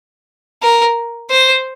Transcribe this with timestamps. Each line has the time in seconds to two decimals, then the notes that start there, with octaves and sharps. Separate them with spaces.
0.63 A#4
1.30 C5